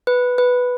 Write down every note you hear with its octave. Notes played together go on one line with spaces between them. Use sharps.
B4
B4